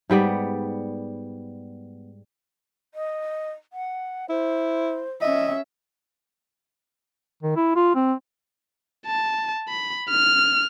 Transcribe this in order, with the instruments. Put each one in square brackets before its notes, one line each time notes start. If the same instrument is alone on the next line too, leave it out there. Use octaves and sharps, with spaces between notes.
[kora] G#2 G3 B3 D5
[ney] D#5
F#5
[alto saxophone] E4 [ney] C5
[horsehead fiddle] C#4 E5 [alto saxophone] D#5
[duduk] D#3
E4
F4
C4
[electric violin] A5
B5
F6